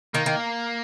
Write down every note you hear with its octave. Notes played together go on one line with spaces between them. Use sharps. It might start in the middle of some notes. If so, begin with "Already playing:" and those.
D#3 A#3
D#3